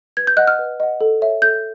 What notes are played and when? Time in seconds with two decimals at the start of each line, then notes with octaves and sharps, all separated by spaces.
0.17 B4 G#6
0.27 G6
0.37 D#5 F#5 F#6
0.47 F6
0.59 B4
0.80 D#5 F#5
1.01 A4
1.22 C#5 E5
1.42 A4 G6